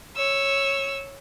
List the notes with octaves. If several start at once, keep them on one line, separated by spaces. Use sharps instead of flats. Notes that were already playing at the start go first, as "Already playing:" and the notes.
C#5 E6